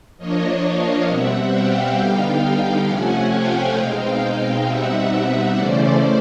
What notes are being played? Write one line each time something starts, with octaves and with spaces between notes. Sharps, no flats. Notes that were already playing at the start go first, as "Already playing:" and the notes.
F3 A#3 D4 C#5 D#5
D#5 F5
B2 G3 C4 E5 F#5
F5 G5
D3 G3 B3 D#4 F5 G5
C3 F3 A3 C#4 F#5 G#5
F5 G5
B2 G#3 C4 D#4 F5 G5
B2 G3 C4 D#4 E5 F#5
C#3 E3 A3 C#4 C5 D5